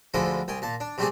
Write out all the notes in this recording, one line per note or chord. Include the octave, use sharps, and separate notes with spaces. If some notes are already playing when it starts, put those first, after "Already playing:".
D2 D3 F3 G#3 E4 B5
C2 G5 G#5
A#2 A5
D4
C3 G3 A3 C4 G4 G#4